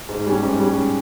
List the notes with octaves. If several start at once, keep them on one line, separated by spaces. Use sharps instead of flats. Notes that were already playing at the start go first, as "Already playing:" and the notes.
G#2
G3 C#4
G#2
G3 C#4